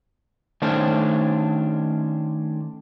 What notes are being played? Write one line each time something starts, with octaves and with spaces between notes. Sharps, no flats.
D#3 A3 C#4 D4 C5 D5